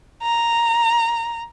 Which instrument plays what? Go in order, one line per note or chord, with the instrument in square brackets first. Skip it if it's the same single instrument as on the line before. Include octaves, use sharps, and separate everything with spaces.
[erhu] A#5